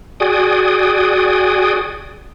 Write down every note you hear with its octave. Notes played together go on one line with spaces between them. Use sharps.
F#4 G#4 D5 G5 G#5 D#6